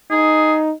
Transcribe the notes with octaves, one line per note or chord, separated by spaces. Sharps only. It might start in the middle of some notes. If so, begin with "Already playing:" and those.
D#4 G#4